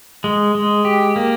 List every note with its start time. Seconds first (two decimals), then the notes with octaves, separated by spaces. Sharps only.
0.24 G#3
0.55 G#3
0.85 G4
1.16 A#3